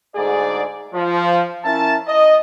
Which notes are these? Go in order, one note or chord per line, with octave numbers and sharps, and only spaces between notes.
D2 G#2 D3 G#4 D5
F3
C#4 E4 A#4 E5 A5
D#5